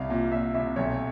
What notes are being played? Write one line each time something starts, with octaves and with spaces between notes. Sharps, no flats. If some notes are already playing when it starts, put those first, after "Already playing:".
Already playing: C2 F5
A#2
A#2 E5
C2 E5
B1 C#5